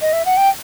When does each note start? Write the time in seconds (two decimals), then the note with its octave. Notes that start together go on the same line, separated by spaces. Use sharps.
0.00 D#5
0.13 E5
0.25 F#5
0.37 G5